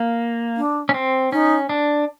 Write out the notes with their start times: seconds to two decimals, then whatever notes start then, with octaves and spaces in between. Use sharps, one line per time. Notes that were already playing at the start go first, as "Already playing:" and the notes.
Already playing: A#3
0.56 D4
0.89 C#4
0.94 C4
1.32 C#4 D#4
1.69 D4